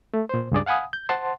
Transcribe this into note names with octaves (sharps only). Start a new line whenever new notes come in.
A3
A#2 C5
C#2 G2 G#4 D5
F5 F#5 G#5 B5 D#6
G6
C5 F#5 A5 C6